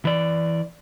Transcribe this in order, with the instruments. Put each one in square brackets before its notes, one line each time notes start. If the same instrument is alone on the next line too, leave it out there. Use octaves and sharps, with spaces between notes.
[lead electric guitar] E3 D5